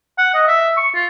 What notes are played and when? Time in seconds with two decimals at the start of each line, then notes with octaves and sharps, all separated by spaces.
0.18 F#5
0.34 D#5
0.48 E5
0.77 C#6
0.94 F4